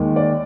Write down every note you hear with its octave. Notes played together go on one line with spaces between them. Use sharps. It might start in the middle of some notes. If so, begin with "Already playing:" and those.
Already playing: D#2 D#3 G#3
D5